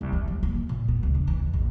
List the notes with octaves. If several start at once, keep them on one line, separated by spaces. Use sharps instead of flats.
C2
E3
F#3
A#3
E3
A#2
B3
C#2
D4
E3
F2
A#1